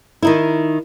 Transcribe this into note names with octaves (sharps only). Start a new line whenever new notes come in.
D#3 D#4 E4